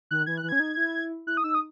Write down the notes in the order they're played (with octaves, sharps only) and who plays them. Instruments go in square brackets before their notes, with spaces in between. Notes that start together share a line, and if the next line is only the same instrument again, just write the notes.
[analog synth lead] D#3 [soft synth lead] F#6
[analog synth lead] E3 [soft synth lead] G#6
[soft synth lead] F#6
[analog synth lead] E3
[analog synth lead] C#4 [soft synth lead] G#6
[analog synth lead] D#4
E4
[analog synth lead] E4 [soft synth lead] F#6
[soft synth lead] D#6
[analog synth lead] D#4 [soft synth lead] E6
[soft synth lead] D#6